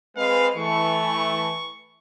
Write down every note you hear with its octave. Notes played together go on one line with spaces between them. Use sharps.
G#3 C4 B4 F5
E3 A3 C#6